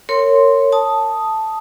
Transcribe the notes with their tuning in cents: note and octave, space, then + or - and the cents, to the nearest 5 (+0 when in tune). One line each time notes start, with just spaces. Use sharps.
A#4 -25 C#5 -5 C6 +0
A5 +0 D#6 +0